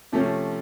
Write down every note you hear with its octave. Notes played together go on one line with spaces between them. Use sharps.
C3 F3 A3 C#4